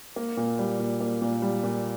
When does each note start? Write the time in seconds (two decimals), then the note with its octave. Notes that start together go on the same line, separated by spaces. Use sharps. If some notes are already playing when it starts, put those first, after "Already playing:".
0.16 A#3
0.37 A#2
0.59 G3
0.79 A#2
1.01 A#3
1.22 A#2
1.42 G3
1.64 A#2